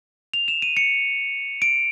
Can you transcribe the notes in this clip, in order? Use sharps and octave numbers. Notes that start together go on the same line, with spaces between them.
F7
E7
D#7
C#7
D7